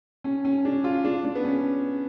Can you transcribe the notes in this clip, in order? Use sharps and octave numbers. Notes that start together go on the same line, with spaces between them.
C#4
C#4
D4
F4
D4
D4
B3
C#4